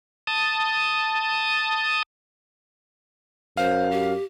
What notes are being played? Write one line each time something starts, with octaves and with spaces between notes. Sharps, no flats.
A5 D#6
F#2 C5 F5
G4